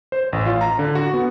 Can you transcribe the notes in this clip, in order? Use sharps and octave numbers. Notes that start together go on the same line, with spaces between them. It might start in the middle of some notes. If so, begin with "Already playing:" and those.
C5
A1
F4
A#5
D3
F#4
B3